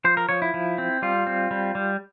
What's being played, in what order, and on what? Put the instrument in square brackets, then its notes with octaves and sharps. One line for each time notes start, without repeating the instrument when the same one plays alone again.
[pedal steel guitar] F3 C5
A#4
F3 C#5
E4
F3
C4
G3 F4
C4
G3
G3